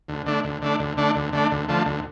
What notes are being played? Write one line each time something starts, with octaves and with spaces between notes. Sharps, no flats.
D2
D3 A3 D4
D2
D3 A3 D4
D2
D3 A3 D4
D2
D3 A3 D4
D2
D3 F3 A3
D2